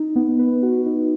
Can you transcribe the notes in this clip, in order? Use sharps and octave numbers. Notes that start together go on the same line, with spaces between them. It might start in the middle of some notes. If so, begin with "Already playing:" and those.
Already playing: D#4
B3
B4
F#4
D#4